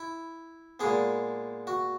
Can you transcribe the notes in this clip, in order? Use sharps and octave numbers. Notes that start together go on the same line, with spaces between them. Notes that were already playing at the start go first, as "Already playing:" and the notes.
Already playing: E4
A#2 G#3 B3 G#4
F#4